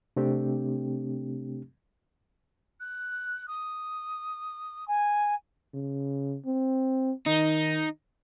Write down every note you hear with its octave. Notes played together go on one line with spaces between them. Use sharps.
C3 A3 C4 D4 G4
F#6
D#6
G#5
C#3
C4
D#3 D#4